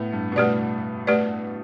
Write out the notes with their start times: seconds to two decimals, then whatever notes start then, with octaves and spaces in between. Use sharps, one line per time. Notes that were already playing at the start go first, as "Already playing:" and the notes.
Already playing: A2 B3
0.13 G2
0.32 B2
0.36 A2 A3 G4 B4 D5
1.07 A3 G4 B4 D5